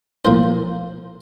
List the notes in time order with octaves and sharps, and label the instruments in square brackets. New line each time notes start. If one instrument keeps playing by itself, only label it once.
[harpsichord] B1 A2 F3 A#3 C5